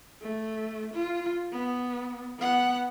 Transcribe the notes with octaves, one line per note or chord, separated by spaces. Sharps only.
A3
F4
B3
B3 F#5